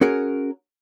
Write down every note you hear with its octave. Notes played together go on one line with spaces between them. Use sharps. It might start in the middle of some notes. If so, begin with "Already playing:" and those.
C#4 F#4 G#4 A#4